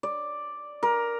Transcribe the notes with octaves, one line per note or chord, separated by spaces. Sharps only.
D5
A#4